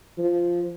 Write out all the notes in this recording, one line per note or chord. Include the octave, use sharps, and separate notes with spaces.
F3